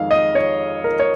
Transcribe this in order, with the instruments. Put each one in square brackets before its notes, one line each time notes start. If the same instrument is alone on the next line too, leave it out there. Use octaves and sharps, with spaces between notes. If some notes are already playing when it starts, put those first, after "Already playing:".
Already playing: [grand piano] F2 D#3 G#3 F5
D#5
C#5
A#4
C#5